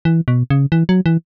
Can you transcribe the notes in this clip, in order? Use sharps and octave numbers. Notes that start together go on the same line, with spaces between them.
E3
B2
C#3
E3
F#3
E3